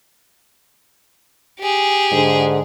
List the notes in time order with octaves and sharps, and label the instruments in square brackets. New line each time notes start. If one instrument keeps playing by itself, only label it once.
[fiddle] G4 G#4
[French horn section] G#2 D3